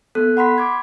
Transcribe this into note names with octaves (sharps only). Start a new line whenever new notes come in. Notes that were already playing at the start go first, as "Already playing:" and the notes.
B3 A4 F#6
F#5 B5 C6 B6
D6 G#6